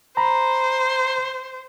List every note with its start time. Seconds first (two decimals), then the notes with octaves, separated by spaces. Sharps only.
0.17 C5 A#5 B5